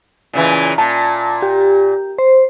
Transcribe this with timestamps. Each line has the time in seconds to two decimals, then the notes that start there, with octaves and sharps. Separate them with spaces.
0.33 A#2 C#3 E3
0.78 A#2 A5
1.42 G4
2.19 C5